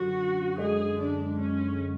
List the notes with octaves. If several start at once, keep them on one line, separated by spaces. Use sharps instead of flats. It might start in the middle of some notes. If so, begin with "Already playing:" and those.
Already playing: F#2 D3 F#3 F#4
F#2 D3 G#3 G#4
D4
C#4